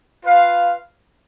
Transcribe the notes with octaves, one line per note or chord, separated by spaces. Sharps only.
F4 B4 F5